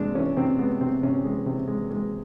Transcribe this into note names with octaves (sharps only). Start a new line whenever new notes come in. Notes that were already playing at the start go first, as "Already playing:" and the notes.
Already playing: C3 G#3 D4
E3 C#4
C3 C4
G#3 B3
C3 C4
C3 C#4
G#3
C3
G#3
G#3